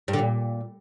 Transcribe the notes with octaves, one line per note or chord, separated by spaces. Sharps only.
G2
D3
A#2